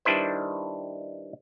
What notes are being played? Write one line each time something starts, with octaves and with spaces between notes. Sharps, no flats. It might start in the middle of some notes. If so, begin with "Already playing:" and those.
D#3 G3 D4 E4 B4 C5